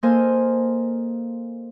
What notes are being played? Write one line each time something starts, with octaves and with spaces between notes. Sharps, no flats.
A#3 A4 C5 D#5 F5 G#5